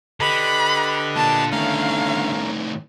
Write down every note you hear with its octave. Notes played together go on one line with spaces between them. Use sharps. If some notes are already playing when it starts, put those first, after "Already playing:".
D3 G4 B4 D#5 B5
A#2 A5
A2 D#3 A3 C#4 F5 A#5